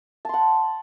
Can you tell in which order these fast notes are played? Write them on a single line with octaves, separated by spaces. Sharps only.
A5 C6 F#5